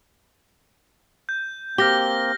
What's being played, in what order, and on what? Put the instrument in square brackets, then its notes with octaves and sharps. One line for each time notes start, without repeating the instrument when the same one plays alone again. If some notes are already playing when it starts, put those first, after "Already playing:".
[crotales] G6
[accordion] A#3 C4 [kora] G4 [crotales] F6 A#6 G7